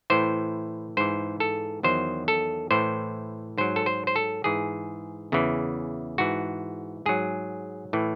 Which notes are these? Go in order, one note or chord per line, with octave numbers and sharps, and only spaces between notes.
A2 E3 C5
G#2 E3 C5
A4
E2 D#3 F#3 C5
A4
A2 E3 C5
G#2 F#3 C5
A4
C5
C5
A4
G#2 E3 G#4
E2 C#3 E3
G#2 E3 F#4
G#2 F#3 G#4
A2 E3